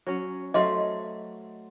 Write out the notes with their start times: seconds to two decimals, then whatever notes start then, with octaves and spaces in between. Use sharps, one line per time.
0.07 F#3 C#4
0.54 F#3 A3 C5 D#5 F5 C6